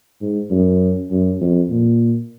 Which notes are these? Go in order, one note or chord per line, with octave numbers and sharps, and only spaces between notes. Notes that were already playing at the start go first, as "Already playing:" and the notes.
G#2
F#2
F#2
F2
A#2